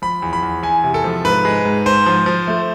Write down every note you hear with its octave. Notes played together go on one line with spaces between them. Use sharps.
F3 B5
E2
B5
E2
E2 G#5
C3
A4
F3
G#2 B4
G#3
G#2
G#2 C5
F3
F3
A3